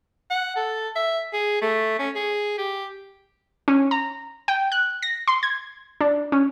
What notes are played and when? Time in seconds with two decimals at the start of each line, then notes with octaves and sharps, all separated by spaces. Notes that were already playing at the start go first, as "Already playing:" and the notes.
0.30 F#5
0.56 A4
0.95 E5
1.33 G#4
1.61 A3
1.99 C#4
2.15 G#4
2.58 G4
3.68 C#4
3.91 A#5
4.48 G5
4.72 F#6
5.02 A#6
5.28 C6
5.43 G#6
6.01 D4
6.32 C#4